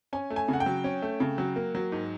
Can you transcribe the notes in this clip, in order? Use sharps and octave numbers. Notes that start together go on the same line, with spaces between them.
C#4 G#5
A3
G#5
C#3 F#5
G5
F#3
C#4
A3
C#3
F#3
A#3
F#3
G#2